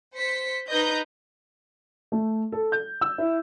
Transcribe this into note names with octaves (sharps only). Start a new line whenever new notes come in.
C5 B6 C#7
D#4 B4 D#5 G6
A3
A4
G6
E6
E4